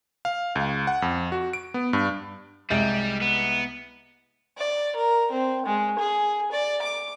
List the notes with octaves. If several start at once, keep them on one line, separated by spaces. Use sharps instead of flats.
F5
C#2
F#5
F2
F#4
D7
B3
G2
C2 G3 G#3 A6
B3
D5
A#4
C4
G#3
G#4
D5
D6